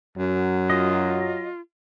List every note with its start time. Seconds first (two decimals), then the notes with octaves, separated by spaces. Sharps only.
0.18 F#2 F#3
0.70 F4 D#5